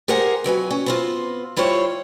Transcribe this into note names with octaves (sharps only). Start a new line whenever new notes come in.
G4 G#4 A#4 C5 F#5 G#5
F2 F#3 B4 G#5
C#4
B3 C4 F4
G3 E4 F4 C5 C#5